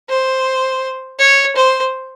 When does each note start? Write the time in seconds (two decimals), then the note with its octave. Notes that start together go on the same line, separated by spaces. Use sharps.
0.09 C5
1.19 C#5
1.56 C5